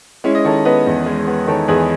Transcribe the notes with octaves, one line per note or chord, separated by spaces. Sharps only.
G#3 C#4 E4
D#5
D#3 A4 C#5
B3 B4 D#5
E2
G#3
B3
D#3 A4 C#5
E2 G#4 B4